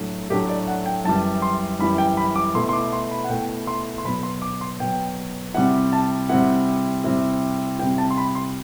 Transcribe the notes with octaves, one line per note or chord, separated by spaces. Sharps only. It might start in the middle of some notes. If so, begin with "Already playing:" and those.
Already playing: A2 F#3 A3 D4
A2 F#3 A3 D4 G4
D5
F#5
G5
F#2 E3 G3 A5
C6
F#2 E3 G3 B5
G5
B5
D6
B2 A3 E4 C6
C6
D6
C6
B5
F#5
B2 A3 E4 G5
C6
C6
B2 F#3 B3 B5
C6
D6
C6
B2 F#3 B3 G5
C3 G3 C4 E4 F#5
A5
C3 G3 C4 E4 F#5
C3 G3 C4 E4
C3 G3 C4 E4 G5
A5
C6
B5
C6